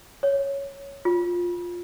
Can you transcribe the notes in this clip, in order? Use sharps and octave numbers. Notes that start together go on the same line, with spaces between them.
C#5
F4